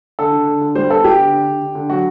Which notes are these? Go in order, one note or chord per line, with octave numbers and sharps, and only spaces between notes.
D3 A4
D3
D3
D3
G3 C5
B3 A4
B3 G4
D3
D3
D3
D3
D3
F#3 F#4